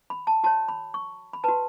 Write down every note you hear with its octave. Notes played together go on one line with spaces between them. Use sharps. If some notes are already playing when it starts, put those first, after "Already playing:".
B5
A5
F#4 C#5 A5
B5
C#6
B5
F#4 B4 A5